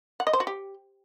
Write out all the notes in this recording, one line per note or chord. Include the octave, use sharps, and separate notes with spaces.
F#5
D#5
C5
F#4
G4